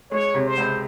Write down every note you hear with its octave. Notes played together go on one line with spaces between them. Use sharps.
G#3 C#5
C3
C5
C#2